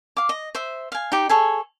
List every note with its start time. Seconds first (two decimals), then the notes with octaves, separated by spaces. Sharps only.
0.17 F5 D6
0.29 D#5
0.55 C5 E5
0.92 F5 G#5
1.12 D#4 G4
1.29 G#4 A4 C#5